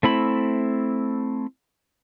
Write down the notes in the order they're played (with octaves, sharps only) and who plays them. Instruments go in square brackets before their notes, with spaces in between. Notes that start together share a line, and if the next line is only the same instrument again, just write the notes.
[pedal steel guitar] A3 C4 E4 B5